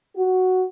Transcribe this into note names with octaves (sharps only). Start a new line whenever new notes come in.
F#4